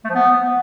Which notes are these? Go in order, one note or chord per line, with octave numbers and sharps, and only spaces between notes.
A3
F3
B3